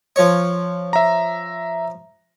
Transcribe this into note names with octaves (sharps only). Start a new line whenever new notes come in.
F3 C#5
E5 A#5